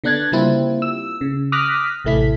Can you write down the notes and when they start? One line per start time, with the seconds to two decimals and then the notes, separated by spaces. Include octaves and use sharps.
0.04 D3 B3 D4 F#6 G#6 A6
0.32 C#3 G3 A#3 C4 E4 F4
0.82 E6
1.21 C#3
1.52 D6 D#6 F6 F#6 A#6 B6
2.05 A1 C3 A3 E4 B6